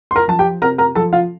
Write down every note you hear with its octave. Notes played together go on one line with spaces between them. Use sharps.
C6
A#4 A#5
F3 A5
G4 G5
C3 A#4 A#5
A#4 A#5
F3 A4 A5
F4 F5